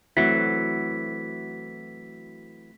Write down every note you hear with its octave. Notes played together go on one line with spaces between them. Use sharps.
E3 F#3 A3 C4 F#4 B6